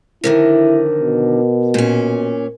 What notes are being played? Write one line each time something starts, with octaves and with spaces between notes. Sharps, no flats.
F2 D3 D#3 E4 A#4
B2
A#2 C#4